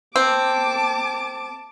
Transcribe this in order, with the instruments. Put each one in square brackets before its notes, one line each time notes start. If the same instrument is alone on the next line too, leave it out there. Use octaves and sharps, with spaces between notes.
[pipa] C4 [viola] A5 D6